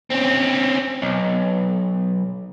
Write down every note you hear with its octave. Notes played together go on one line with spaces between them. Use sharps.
C4 C#4
B1